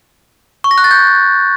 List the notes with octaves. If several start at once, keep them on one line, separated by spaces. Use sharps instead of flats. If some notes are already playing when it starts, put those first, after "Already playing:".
C#6
A#6
F#6
A6
G6